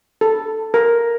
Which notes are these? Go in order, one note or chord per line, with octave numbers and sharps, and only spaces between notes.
A4
A#4